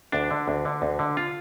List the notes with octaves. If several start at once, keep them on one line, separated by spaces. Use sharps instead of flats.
D2 D4
D3
D2
D3
D2
D3
F4